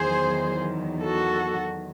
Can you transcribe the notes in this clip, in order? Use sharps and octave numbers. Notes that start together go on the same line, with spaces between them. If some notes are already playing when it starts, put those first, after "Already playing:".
Already playing: E2 D#3 F#3 G#4 C5
F#4 A4